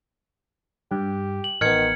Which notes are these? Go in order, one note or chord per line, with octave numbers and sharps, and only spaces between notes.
G2 G4
F#7
A1 D#3 B3 F6 G#6 C#7